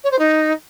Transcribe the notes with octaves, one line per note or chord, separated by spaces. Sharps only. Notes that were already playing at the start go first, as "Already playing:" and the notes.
C#5
C5
D#4